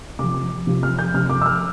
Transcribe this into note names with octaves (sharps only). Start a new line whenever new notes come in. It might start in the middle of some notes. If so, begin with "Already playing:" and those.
C3 F3 D6
C3 F3
F6
G6
C3 F3 F6
D6
E6
F6